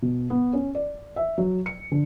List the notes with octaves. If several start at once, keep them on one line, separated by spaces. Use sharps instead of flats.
B2
B3
C#4
D5
E5
F#3
C#7
D3